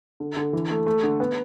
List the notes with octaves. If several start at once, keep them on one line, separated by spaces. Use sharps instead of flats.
D3
D3
E3
A3
A3
D3
B3